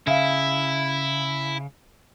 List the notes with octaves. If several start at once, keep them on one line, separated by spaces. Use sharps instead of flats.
C#3 E4 E5 F5